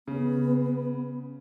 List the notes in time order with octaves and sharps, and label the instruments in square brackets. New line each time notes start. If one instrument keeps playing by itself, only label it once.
[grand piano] C#3 [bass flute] B3